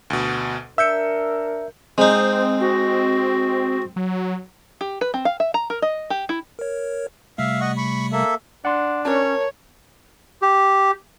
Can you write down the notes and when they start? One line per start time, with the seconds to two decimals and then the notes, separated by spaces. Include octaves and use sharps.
0.10 D2 B2
0.78 D4 A#4 E5 E6 G6 C#7
1.98 G#3 C4 D#4 C5
2.60 F#4
3.96 F#3
4.81 G4
5.01 B4
5.14 C4
5.25 F5
5.40 E5
5.54 A#5
5.70 A#4
5.82 D#5
6.10 G4
6.29 E4
6.59 A#4 C#5
7.38 C3 G3 A3 E5 F5
7.61 D#5 F#5 C#6
7.77 B5 C#6
8.12 A#3 A4 E5
8.65 D4 F#5 C6
9.05 C#4 A#4 C#5 A5
10.42 G4